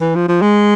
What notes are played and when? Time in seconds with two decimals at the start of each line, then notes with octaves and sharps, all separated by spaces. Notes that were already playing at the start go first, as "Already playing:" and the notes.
0.01 E3
0.15 F3
0.28 F3
0.42 G#3